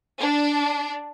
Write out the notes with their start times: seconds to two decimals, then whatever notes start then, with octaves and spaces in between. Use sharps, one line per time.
0.20 D4